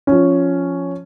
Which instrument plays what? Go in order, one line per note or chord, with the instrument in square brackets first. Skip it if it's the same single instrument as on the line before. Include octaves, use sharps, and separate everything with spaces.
[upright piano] F3 C#4